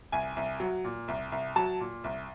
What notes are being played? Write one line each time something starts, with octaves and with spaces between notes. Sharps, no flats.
C2 G#5
C2
F#3
A#2
C2
C2
F#3 A5
A#2
C2